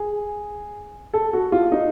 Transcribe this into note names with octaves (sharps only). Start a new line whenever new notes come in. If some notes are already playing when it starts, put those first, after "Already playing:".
Already playing: G#4
A4
F#4
F4
D#4